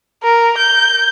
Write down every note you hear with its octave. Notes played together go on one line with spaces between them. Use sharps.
A#4
G6